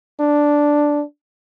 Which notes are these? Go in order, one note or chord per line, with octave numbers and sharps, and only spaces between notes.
D4